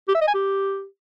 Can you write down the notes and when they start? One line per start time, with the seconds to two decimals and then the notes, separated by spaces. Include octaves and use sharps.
0.08 G4
0.15 E5
0.21 D#5
0.28 G#5
0.34 G4